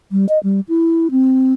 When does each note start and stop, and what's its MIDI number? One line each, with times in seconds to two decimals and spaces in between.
0.12 0.26 55
0.29 0.39 75
0.44 0.60 55
0.69 1.08 64
1.11 1.53 60